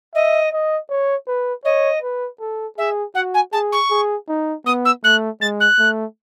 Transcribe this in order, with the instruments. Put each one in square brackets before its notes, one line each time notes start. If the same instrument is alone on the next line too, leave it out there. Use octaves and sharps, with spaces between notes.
[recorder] D#5 [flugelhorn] E5
[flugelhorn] D#5
C#5
B4
[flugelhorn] C#5 [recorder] D#5
[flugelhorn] B4
A4
[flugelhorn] G#4 [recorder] E5
[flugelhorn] F#4 [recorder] F#5
[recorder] G#5
[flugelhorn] G#4 [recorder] A5
[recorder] C#6
[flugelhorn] G#4
D#4
[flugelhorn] B3 [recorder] D#6
[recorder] E6
[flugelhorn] A3 [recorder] F#6
[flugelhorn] G#3 [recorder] A6
[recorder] F#6
[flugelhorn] A3